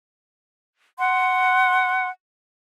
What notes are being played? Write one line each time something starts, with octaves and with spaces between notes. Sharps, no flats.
F#5 C6